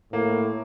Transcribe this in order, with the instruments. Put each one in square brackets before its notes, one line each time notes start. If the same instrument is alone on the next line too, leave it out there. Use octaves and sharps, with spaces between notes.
[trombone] A2 [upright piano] A#3